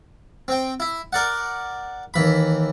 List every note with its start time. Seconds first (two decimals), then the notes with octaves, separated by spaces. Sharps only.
0.48 C4 G5
0.80 E4
1.13 A#4 D5 F#5
2.14 D#2 E3 B5